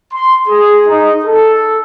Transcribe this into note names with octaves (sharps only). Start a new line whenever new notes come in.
C6
G#4
D#4
A4